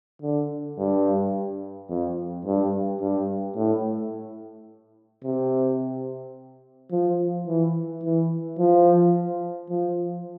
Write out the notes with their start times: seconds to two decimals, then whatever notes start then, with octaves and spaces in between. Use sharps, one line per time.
0.22 D3
0.78 G2
1.90 F2
2.45 G2
3.01 G2
3.56 A2
5.24 C3
6.91 F3
7.47 E3
8.03 E3
8.59 F3
9.70 F3